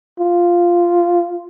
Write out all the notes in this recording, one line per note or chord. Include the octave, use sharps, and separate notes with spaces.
F4